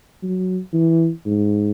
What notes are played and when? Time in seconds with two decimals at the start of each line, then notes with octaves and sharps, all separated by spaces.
0.23 F#3
0.74 E3
1.26 G#2